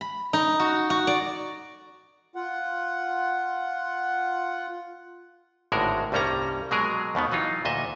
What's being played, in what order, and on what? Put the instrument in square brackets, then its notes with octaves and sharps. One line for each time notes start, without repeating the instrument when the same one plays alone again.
[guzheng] B5
D#4
F#4
F#4
D5
[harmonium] F4 F#5
[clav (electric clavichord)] G#1 A2 D3 G#3 F#4 A#4
C2 G2 G3 A#3 C#4 A#5
B2 F#3 G#3 G#4 A#4
D#2 B2 D#3 B3
E3 F#3 D#4 F4
D2 A#2 D#5 E5